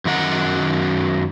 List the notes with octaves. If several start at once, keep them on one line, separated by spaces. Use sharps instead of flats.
F#2 D#3 A#4 F#5